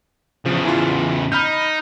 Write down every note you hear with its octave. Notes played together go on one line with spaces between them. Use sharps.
E2 C#3 F3
E3 F4
D#4 B5 F6 G6